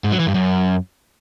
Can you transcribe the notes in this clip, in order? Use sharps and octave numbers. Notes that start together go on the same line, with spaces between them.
G#2
F#3
E3
G2
F#2